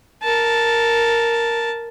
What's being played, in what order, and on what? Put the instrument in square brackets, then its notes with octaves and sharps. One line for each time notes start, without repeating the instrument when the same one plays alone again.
[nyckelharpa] A#4 A5